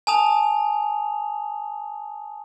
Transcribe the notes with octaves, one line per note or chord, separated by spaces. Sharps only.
G#5 A5 D#6 F7